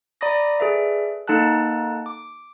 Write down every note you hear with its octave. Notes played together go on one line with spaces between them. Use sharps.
D5 A#5 B5 D6 D#6 A#6
G#4 A4 B4 D5 E5
A#3 D#4 A4 F#5 A5 F#6
D6